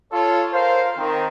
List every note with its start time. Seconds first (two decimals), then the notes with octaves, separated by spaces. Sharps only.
0.12 F4 A4 C#5
0.53 A#4 C5 F5
0.97 D#3 C4